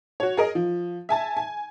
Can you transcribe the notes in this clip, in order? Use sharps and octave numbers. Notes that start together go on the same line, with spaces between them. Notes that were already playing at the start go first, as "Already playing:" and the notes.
F#4 C#5
G#4 A#4 D#5
F3
E5 G#5 A5
G#5